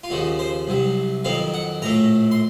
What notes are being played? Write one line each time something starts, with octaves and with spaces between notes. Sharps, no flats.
F4
D#2 C#3 F3 F#4
C5
C2 C3 F#3
F2 D#3 F#3 C4 F5
F#5
A#1 A2 A3 A#5
C6